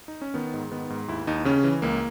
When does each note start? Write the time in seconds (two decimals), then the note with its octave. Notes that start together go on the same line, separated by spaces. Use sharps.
0.08 D#4
0.21 C#4
0.34 D#3 B3
0.54 G#2
0.71 D#3 B3
0.90 G#2
1.08 D#2 E4
1.27 D#2 D#4
1.45 C#3 C#4
1.64 E3
1.82 C#2 A#3